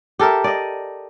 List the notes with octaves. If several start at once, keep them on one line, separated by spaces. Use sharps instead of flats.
G4 A4 A#4 E5
D5 D#5